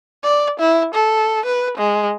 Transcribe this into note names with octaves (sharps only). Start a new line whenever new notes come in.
D5
E4
A4
B4
G#3